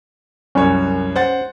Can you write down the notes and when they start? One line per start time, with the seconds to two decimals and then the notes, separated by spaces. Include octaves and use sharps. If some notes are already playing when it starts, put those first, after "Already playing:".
0.55 C2 F#2 C#4 C#5
1.16 C5 F#5 A6